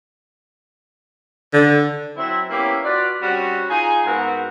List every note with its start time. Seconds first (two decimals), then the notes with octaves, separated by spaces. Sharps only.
1.53 D3
2.16 F#3 C4 E4
2.50 A#3 B3 C#4 E4 G4
2.84 F4 F#4 B4 D5
3.22 G3 C4 C#4 F#4
3.70 D#4 F4 G#4 G#5
4.06 G#2 B3 C4 F#4 A#4